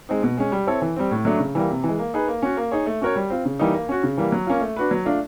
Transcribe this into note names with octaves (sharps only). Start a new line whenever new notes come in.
G#3 C4 D#4
B2
G#3 C#4
G3
C4 E4 A4 C#5
E3
G3 C4
A2
F#3 A3 D4
C#3
E3 G3 A#3
C3
E3 G#3
A#3
D#4 G#4 B4
A#3
C#4 F#4
A#3
D#4 G#4 C#5
A3
C#4 F#4 A#4 C#5
G3
C4 F4
C#3
E3 G3 A#3 D#4
A#3
C#4 F#4
C#3
E3 G3 A#3
F#3
A#3 C#4 F4
A3
D4 F#4 B4
F#3
A3 D4 F4